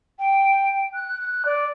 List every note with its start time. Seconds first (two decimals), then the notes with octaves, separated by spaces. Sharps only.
0.19 G5
0.94 F#6
1.45 D5